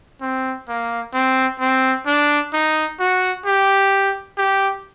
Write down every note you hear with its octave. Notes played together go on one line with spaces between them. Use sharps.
C4
A#3
C4
C4
D4
D#4
F#4
G4
G4